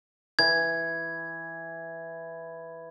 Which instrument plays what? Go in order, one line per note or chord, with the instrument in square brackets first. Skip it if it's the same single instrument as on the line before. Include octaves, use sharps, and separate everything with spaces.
[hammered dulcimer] E3 [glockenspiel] G#6